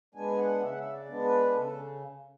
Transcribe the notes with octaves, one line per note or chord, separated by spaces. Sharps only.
G#3 B3 D4 G#5
F#5
C#3 E5
F#5
E5
D5
G#3 B3 D4
B4
C#3 A4